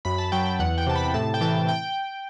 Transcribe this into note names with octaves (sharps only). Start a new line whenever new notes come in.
F#2 B5
A5
F#3 G5
G5
E2 F#5
G5
C3 A5
B5
A2 A5
G5
E3 A5
G5